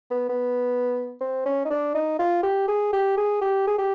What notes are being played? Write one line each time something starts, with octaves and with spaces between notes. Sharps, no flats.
B3
B3
C4
C#4
D#4
D4
D#4
F4
G4
G#4
G4
G#4
G4
G#4
G4